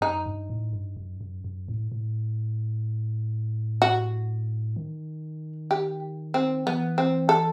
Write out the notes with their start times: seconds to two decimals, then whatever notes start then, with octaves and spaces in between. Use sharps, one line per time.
0.01 F#2 D#4
0.26 G2
0.50 A2
0.73 G2
0.97 F#2
1.21 F#2
1.44 F#2
1.68 A2
1.92 A2
3.82 F#4
4.76 D#3
5.71 G4
6.34 C4
6.67 E3 B3
6.98 C4
7.29 A4